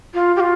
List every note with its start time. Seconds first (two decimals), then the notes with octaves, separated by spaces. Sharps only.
0.14 F4
0.36 G4
0.40 F4